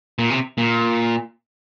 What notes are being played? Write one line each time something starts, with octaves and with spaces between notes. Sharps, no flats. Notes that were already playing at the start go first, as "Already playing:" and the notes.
A#2
C3
A#2